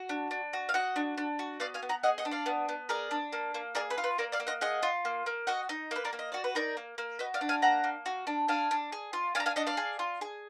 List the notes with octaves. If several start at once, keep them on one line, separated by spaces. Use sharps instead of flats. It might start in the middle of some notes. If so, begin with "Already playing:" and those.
Already playing: F#4
D4
D4
F#4
F5
F#4 D#5 F#5
D4
D4
F#4
B3 D5 F5
F5 G#5
B3
F#5 A#5
G#4 D#5 F#5
D#5 F#5
D4
D5 F5
B3
B3
G#4 A#4 D5
D4
A#3
A#3
G#4 A#4 D5
B4
F4
B4
A#3 A#4 D5
D5 F5
A#3
D#5 F#5
G#4 D#5 F#5
F4
A#3
A#3
F#4 D#5 F#5
D#4
A#3 B4
A#4 D5
A#3
D#5
F#4 D5
B4
D#4 A#4 D5
A#3
A#3
F#4 B4 D#5
D5 F5
D4
F5 G#5
A#3 F#5 A#5
A#3
F#4
D4
D4 F5 G#5
D4
G#4
F4
D4 F5 G#5
A#5
F5 G#5
D4 D#5 F#5
D5 F5
G#4
F4
G#4